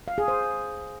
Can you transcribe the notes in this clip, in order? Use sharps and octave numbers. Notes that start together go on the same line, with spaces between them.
F5
G#4
C5